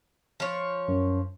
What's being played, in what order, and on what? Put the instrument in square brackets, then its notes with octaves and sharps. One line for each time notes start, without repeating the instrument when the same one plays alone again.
[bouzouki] F3 C#5
[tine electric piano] F#2